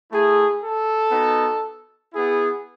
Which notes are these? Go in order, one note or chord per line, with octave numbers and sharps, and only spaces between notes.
A3 E4 G#4
A4
B3 D#4 F#4
B3 E4 G#4